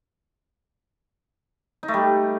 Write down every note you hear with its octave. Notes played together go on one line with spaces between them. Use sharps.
D#4
A3
G3